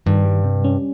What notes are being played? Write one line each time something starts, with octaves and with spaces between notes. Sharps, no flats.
G2 D#3
G3
C3
C#4